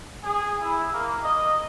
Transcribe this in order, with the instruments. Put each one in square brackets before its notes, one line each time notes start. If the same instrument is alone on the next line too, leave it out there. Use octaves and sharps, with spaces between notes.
[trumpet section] G#4
E4
A#3
D#5